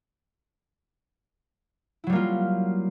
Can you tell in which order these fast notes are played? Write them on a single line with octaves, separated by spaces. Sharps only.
E4 F#3 G3 A#3 F4